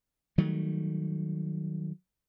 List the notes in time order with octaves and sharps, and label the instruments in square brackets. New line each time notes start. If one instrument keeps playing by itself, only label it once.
[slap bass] D#3 F#3 G3 A3